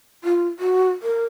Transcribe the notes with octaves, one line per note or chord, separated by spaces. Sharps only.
F4
F#4
A#4